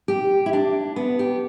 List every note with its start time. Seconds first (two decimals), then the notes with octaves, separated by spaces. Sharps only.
0.08 G4
0.46 E4
0.53 D4
0.96 B3
1.19 G4